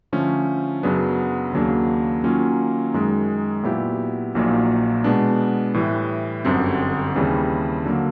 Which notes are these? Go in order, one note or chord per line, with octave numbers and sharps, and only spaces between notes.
D3 F3 A3 C#4
F#2 C#3 F#3 B3 D4
D#2 C#3 F#3 A#3 D4
D#3 F#3 A#3 C#4 F4
F#2 D#3 G#3
A#2 F#3 B3 E4 G4
A#1 A#2 F#3 A#3 D#4
B2 G#3 B3 D4
A2 E3 G3
G1 F#2 D3 G3 C4
D#2 C#3 E3 G3 C4
D3 F#3 A#3